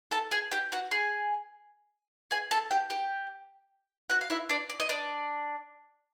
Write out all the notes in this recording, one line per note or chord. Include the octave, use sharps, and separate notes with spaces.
A4 A5
G#4 G#5
G4 G5
F#4 F#5
G#4 G#5
G#4 G#5
A4 A5
G4 G5
G4 G5
F#4 F#5
F5
E4 E5
D4 D5
D5
D#5
D4 D5